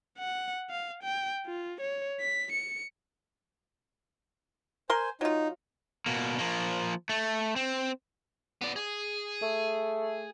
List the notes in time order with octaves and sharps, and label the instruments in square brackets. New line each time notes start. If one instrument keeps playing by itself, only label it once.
[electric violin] F#5
F5
G5
F4
C#5
B6
C#7
[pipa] A#4 C6 [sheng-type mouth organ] C5 G#5
[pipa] F#3 F4 [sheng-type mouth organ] D#4
[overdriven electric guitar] B2 A#3
F3 A#3
A3
C4
B3 D5
G#4
[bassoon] A3